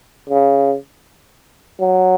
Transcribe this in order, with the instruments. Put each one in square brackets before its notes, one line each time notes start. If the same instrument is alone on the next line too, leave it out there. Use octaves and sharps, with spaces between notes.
[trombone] C#3
F#3